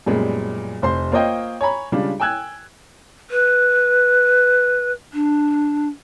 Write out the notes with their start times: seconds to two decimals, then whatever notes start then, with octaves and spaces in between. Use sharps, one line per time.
0.06 F#2 A#2 G3 G#3 B3
0.82 F1 C5 C6
1.12 A#3 F4 C5 C#5 D#5 G5
1.61 C#5 G#5 A#5 B5
1.92 C#3 G3 G#3 D4 F4
2.20 G5 G#5 E6 F#6 G#6
3.30 B4
5.13 D4